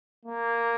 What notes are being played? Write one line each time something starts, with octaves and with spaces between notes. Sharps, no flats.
A#3